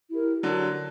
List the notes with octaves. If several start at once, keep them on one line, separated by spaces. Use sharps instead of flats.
E4 G4 A#4
D3 F#3